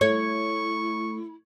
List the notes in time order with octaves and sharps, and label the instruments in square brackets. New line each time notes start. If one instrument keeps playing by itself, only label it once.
[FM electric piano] A3 [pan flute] E4 [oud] C#5 [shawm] C#6